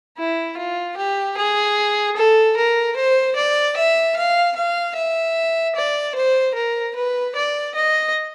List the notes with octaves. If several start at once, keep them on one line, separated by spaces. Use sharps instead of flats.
E4
F4
G4
G#4
A4
A#4
C5
D5
E5
F5
F5
E5
D5
C5
A#4
B4
D5
D#5